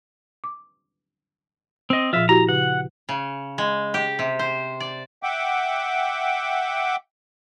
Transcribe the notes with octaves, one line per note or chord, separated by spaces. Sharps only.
D6
C4 D#5
A#2 F3 F4 E5
E4 F#4 G4 A#5
C#3 F#5
C#3
G#3
G4
C3
C5
D5
E5 F#5 G5 D6